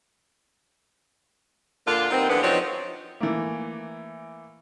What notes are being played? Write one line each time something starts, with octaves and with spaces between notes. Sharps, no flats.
A#2 D3 D4 F4
D#3 G3 B3 C4
D3 E3 G#3 B3 D4
F3 F#3 C4 C#4 D#4 F#4
E3 A3 A#3